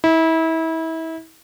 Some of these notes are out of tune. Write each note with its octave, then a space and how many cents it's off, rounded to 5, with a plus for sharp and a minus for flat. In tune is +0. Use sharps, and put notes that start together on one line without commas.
E4 -30